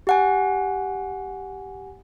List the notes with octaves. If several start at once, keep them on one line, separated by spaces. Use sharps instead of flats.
G4 F#5 G#5